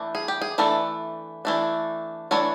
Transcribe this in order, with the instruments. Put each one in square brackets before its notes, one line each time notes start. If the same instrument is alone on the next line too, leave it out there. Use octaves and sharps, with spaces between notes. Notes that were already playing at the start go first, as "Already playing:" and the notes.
Already playing: [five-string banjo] E3 A3 D4
G#4
G4
G#4
E3 A3 D4 A4
E3 A3 D4
E3 A3 D4 C#5